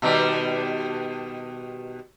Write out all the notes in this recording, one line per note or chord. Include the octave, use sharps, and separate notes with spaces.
B2 D#3 G3